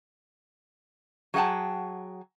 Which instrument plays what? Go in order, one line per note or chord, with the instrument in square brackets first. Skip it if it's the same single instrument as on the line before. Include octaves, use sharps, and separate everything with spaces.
[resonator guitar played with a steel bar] F#3 G#4 F#5 G5 A5